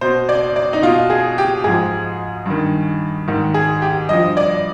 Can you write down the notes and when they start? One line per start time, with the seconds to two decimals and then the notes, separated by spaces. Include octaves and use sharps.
0.01 B2 C5
0.29 D5
0.56 D5
0.73 D#4
0.83 B2 F4
1.10 G#4
1.38 G4
1.64 G#2 F3 G#4
2.46 G2 D#3
3.28 G#2 D#3
3.54 G#4
3.82 G4
4.09 G2 F3 D#5
4.37 D5